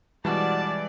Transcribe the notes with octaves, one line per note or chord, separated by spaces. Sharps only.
B2 E3 F3 G3 G#3 F#4 D5 A5